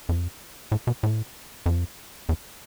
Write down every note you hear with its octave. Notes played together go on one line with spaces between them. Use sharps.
F2
A2
B2
A2
F2
E2